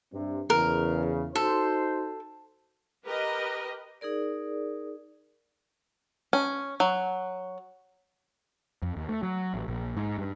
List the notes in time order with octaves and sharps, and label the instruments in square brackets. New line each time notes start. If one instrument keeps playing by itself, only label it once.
[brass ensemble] G2 C3
[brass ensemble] E2 C#3 [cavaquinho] A#4
[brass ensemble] D#4 F#4 C5 [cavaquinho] A4
[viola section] G4 A#4 B4 D#5
[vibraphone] D#4 G#4 A#4 D5
[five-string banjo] C#4
F#3
[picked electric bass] F2
D#2
A3
F#3
A1
A#1
G#2
G2